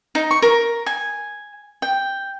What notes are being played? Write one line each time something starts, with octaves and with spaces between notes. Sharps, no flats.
D#4
C#6
A#4
G#5
G5